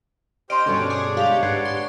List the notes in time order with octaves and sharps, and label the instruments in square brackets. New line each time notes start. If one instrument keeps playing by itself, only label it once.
[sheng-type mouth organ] G4 C5 F6 [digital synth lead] D#5 [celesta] C6 D7
[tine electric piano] G2 B2 D3 [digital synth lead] C#4 [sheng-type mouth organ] D4 C#5 D5
[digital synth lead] G#4 [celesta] D6
[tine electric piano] G#3 [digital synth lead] G4 [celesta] F5 F7
[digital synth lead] G#2 [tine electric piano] B4 F#5 [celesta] G#6 C7
[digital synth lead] C6